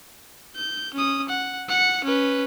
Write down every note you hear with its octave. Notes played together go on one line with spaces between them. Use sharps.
G6
C#4 D#6
F#5
F#5 C#7
C#4 B4